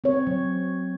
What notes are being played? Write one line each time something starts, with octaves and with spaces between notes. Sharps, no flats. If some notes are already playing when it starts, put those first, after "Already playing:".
C4 C#5
F#3